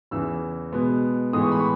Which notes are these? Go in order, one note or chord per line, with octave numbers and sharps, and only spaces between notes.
E2 C#3 E3 E6
B2 G#3 B3
A2 E3 G#3 B3 D#6
C#6
B5
C#6